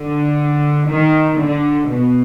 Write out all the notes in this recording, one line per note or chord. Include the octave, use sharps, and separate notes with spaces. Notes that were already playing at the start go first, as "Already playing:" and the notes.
Already playing: D3
D#3
D3
B2